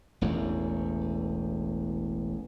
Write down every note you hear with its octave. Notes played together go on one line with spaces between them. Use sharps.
E1 A1 E2